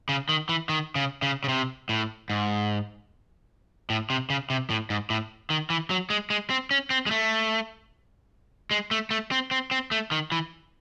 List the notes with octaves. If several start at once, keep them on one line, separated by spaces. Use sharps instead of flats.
C#3
D#3
E3
D#3
C#3
C#3
C#3
C3
A2
G#2
A2
C3
C#3
C3
A2
G#2
A2
D#3
E3
F#3
G#3
G#3
C4
C#4
C4
G#3
A3
G#3
A3
A3
C4
C4
C4
A3
D#3
E3